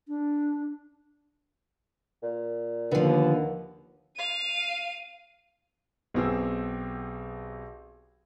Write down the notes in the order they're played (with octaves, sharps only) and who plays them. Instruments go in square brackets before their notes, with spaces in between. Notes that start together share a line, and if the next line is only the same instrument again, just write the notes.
[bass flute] D4
[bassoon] A#2
[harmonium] D#2 [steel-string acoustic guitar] D3 F3 [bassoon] B3
[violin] F5 D#7
[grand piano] B1 B2 C4 G4 G#4 E6